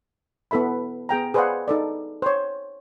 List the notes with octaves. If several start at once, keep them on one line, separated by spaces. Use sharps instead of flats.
B3 E4 A4 E5 B5
B3 G#4 G5 A#5
G#4 B4 C5 D5 F5 F#5
D#4 A4 D5
C5 C#5